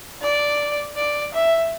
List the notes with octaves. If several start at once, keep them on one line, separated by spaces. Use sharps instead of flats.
D5
D5
E5